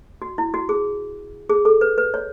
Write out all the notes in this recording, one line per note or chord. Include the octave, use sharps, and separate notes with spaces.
F#4
E4
F#4
G#4
G#4
A4
B4
B4
C#5